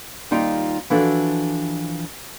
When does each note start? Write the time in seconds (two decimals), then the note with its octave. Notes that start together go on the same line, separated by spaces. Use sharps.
0.31 D#2 G3 D#4 F4 D#5 G5
0.90 E3 F3 D4 F#4 A4